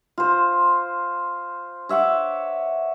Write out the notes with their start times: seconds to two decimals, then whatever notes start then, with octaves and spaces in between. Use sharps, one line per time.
0.18 F4 C5
1.89 C#5 E5 F#5 D6